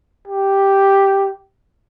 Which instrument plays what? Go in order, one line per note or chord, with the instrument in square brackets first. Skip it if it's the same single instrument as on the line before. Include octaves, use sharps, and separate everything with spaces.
[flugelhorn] G4